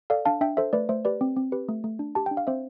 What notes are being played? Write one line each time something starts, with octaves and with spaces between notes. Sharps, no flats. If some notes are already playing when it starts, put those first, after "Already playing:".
A4 D5 F5
D4 F5 A5
D4 E5 G5
A4 C5 E5
A3 B4 D5
A3 C5 E5
G4 B4 D5
C4
C4
G4 B4
A3
A3
D4
G4 A5
D4 G5
F5
C4 C5 E5